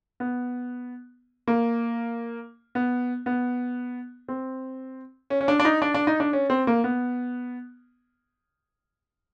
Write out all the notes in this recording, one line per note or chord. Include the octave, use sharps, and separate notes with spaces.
B3
A#3
B3
B3
C4
C#4
C#4
D4
D4
D#4
D4
D4
D#4
D4
C#4
C4
A#3
B3